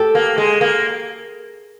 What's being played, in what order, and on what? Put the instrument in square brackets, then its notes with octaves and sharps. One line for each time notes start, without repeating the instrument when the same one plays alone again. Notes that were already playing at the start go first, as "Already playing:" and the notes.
Already playing: [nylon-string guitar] G4 A4
[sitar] A#3
G#3
A#3